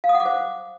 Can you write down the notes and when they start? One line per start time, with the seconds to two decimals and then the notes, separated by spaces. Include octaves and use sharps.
0.04 F5
0.09 D#6
0.15 F#5
0.20 D6
0.25 C5